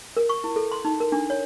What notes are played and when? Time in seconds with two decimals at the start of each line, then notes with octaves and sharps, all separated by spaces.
0.17 A#4
0.29 C#6
0.44 E4
0.56 A4
0.72 C6
0.85 D#4
1.00 A#4
1.12 D4
1.30 C#5